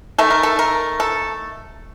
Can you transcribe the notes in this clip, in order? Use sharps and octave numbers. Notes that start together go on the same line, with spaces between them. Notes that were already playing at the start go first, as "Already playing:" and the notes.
D#3 A3 A4
A#4
A4
A#4
A4